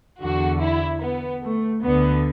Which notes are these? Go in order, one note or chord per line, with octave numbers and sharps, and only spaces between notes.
E2 D3 F#4
E4
B3
A3
D2 D3 B3